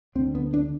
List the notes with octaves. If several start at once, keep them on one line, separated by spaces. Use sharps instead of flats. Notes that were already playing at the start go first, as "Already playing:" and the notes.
D2 D3 C4
B3
D4